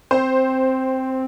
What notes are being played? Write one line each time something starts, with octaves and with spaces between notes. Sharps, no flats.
C4 C5